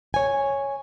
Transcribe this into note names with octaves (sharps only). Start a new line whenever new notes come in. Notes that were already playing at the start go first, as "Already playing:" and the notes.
C#5 G#5